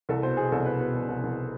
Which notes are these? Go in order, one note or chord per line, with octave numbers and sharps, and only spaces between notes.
C2 A4
B2 C5
B2 G#4
C2 A4
C2 B4
B2 B4
C2
C2
C2